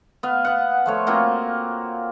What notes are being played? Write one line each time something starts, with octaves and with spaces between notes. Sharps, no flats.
B3 F5
B3 F#5
F3 A3 C#5
A#3 C4 F4 F#4